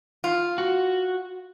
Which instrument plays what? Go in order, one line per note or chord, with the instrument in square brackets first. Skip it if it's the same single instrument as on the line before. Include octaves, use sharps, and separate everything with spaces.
[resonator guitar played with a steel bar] F4
[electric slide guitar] F#4